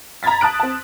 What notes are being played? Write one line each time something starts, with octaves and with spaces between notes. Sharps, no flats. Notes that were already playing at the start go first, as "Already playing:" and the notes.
A#5 B5 G#6 A6 B6
A5 D#6 F#6 D7
C4 A5